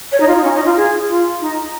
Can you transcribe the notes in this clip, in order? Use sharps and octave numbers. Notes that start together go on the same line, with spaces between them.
C#5
D#4
F4
D#4
C#4
D#4
F4
G#4
F4
D#4